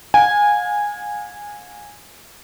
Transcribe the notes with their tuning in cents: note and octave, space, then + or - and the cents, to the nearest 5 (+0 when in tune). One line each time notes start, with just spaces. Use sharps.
F5 +40 G#5 -10